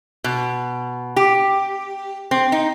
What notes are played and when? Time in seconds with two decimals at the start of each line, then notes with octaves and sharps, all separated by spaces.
0.24 B2
1.16 G4
2.31 C4
2.52 D#4